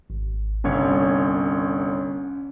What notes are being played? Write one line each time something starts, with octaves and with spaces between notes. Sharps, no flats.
G#1
G1 C2 C#4 C#5